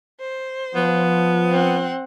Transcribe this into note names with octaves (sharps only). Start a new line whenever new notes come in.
C5
F3 B3
C4 F#5